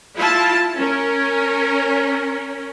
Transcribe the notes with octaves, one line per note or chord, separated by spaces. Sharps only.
E4 F4 A5
C#4 A#4